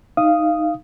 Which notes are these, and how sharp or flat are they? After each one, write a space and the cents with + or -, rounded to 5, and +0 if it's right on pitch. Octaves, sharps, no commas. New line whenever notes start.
D#4 +0 F5 -15 D#6 +0